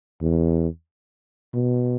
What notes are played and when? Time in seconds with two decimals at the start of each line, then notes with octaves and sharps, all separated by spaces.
0.21 E2
1.53 B2